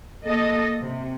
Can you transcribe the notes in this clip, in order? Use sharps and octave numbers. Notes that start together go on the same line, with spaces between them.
A#3 A4 D#5
C3